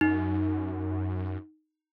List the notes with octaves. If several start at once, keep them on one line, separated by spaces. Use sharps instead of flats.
F#2 D#4